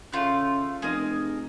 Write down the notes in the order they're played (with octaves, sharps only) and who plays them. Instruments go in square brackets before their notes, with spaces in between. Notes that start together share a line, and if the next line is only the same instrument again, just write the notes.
[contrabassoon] C#3 [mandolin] A3 F4 F#6
[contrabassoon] F1 [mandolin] G#4 A#4 D#5